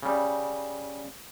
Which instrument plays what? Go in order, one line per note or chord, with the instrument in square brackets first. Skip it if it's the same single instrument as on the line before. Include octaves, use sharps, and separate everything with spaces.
[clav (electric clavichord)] C#3 G3